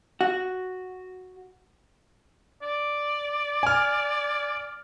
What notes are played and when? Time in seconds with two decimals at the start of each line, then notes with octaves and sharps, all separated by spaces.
0.21 F#4
2.62 D5
3.63 G#5 F6